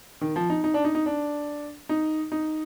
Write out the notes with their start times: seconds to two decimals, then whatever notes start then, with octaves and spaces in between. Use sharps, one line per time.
0.21 D#3
0.36 F3
0.50 D#4
0.64 D#4
0.74 D4
0.85 D#4
0.95 D#4
1.06 D4
1.89 D#4
2.32 D#4